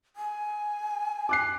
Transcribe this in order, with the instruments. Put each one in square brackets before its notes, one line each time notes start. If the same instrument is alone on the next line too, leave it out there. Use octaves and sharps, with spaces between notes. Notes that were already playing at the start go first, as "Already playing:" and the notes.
[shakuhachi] G#5
[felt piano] D6 F#6 C7